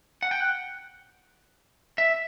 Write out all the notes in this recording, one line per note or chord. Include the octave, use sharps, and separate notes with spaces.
F#5
G5
F#5
E5